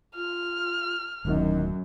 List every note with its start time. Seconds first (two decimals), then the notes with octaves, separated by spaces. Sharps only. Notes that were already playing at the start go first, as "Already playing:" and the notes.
0.16 F4 F6
1.25 D1 F#2 A2 D#3